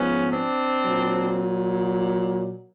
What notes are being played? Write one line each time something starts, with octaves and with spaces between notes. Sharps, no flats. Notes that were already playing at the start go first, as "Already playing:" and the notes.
Already playing: G#2 F3 B3 C#4
C4 D4
A#2 F#3